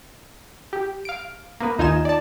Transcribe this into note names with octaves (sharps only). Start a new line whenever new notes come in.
G4
F5 D7
A#3 B3 B4
D#2 D#4 F4 D#5 G#5 E7
D5 A5